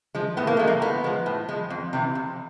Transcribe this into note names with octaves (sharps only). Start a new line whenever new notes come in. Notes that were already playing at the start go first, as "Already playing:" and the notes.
F3 G#3
A2 B3
A#3
F3 G#3 A3
A#3
A2 B3
F3 G#3
A2
F3 G#3
F2
C3 E3
F2